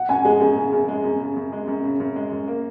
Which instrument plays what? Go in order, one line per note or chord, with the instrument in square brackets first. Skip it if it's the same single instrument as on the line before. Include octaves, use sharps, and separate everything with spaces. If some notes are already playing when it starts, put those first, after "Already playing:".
Already playing: [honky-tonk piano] F#5
[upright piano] F#2 [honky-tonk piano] G#5
[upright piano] G#3 [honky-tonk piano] G#4
[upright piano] F#2 [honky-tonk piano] G#4
[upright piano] C#3
F#2
G#3
F#2
C#3
F#2
G#3
F#2
C#3
F#2
G#3
F#2
A#3